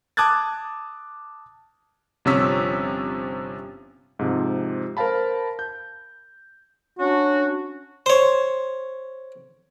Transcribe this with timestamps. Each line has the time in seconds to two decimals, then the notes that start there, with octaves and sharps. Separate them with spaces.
0.17 A5 D6 D#6 F#6 G#6 A6
2.25 G1 C3 F3 C#4 E6 B6
4.19 G#2 C3 F3
4.97 A#4 C5 F5 A5 B5
5.59 G6
6.99 C#4 D4 F#4
8.06 C5 C#5